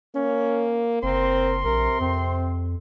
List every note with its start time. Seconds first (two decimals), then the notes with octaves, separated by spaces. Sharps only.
0.15 A#3 C#4
1.03 F#1 C4 A#4 C6
1.64 A#1 C3 A#4
2.00 F2 C4